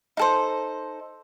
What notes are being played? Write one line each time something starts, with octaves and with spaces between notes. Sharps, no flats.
D#4 A4 C5